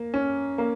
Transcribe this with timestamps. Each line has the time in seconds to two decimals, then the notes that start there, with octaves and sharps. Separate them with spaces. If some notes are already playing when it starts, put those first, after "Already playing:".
Already playing: A#3
0.14 C#4
0.58 A#3